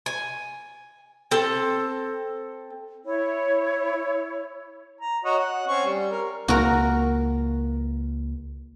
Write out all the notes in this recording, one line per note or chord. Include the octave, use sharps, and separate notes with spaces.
G#5
C4 A4
E4 C#5
A#5
F#4 C#5 D#5
F#5
C4 C#4 C#6
G3
A#4
C#2 A#3 F#4 A#4